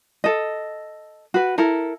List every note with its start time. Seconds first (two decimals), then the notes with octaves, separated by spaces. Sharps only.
0.24 A4 D#5
1.34 F#4 B4
1.58 E4 A4 A#4